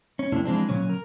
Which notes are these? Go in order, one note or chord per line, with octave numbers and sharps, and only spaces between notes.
C#4
F#2 C3 A#3 D4 E4
E3 F3 G#3 C4 D4
A#2 C#3 F#3 C#4
A#4